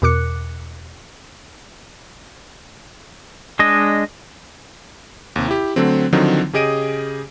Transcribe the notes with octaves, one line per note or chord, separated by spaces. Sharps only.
E2 B2 A#4 D6 F#6 C#7
G#3 D4 D#5
D#2 C3
E4 G4
D3 F#3 A3 C4
D3 D#3 F3 F#3 C4 D#4
C#3 G4 G#4 D#5 D7 D#7